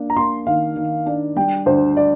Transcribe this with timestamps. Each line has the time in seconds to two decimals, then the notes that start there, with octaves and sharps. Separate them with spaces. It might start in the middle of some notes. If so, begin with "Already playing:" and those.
Already playing: A#3 D4
0.10 A#5
0.16 A#3 C6
0.47 D#3 F5
0.76 D#3
1.06 D4
1.36 G3 G5
1.66 D2 C5
1.97 D5